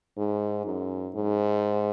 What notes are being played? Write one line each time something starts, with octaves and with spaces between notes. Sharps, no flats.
G#2
F#2
G#2